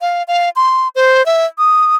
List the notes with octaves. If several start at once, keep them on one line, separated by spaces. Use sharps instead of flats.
F5
F5
C6
C5
E5
D#6